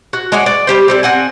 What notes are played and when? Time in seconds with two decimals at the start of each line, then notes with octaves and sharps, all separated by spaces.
0.13 F#4
0.32 G#3 C#5 D5 F#5
0.46 D5
0.67 G3 G4 C5
0.88 C4 A4 D5
1.03 C4 F#5 G#5